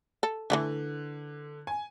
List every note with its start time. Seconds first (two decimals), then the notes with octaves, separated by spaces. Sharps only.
0.23 A4
0.50 D3 E3 G3 A3
1.67 G#5